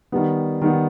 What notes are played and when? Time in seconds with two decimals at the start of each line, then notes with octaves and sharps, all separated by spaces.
0.12 D#3 G3 B3
0.62 D#3 G3 B3